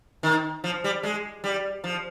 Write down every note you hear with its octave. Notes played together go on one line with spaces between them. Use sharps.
D#3
F3
G3
G#3
G3
F3